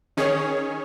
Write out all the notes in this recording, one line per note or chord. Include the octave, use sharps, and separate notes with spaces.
D#3 C#4 G#4 C#5